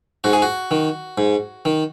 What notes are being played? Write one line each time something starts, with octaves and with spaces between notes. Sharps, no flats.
G#2 F#4
G#4
F#4
D#3
G#2
D#3